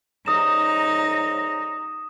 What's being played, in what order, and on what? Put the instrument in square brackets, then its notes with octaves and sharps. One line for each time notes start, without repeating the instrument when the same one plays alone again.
[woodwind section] C2 C#3 A#5 [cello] D#4 [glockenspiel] D#6 E7